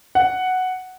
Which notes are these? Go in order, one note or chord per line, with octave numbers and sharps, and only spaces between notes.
F#5